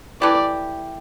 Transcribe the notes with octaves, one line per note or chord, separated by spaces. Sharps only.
E3 A3 E4 G4 D5